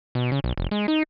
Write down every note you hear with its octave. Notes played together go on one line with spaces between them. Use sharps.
B2
C#3
B1
F1
G#3
D#4